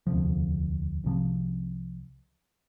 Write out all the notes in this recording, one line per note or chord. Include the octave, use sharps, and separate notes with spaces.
E1 D2 C3 F3
C2 C3 F3